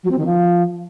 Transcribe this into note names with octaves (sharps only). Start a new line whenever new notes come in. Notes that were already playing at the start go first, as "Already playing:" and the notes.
F#3
C4
D#3
F3